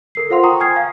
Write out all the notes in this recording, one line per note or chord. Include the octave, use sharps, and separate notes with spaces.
A4 A#4 C7
F4 C5 F5 F#5 C6
G5 A#5 C#6 D#6
G#5 F6 G#6 C7
F5